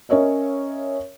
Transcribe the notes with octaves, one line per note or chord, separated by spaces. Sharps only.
C#4 A#4 C#5 D#5 E5